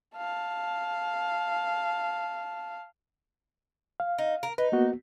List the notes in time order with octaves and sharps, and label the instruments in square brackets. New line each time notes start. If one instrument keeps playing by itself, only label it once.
[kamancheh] F5 A5
[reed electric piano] F5
[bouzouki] D#4
A#4
[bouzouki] D#4 [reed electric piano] B4
[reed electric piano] A#3 B3 F#4